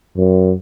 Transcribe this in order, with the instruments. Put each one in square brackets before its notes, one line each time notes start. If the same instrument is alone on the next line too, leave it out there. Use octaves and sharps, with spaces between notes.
[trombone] F#2